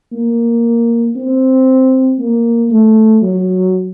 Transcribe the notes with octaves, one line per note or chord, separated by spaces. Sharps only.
A#3
C4
A#3
A3
F#3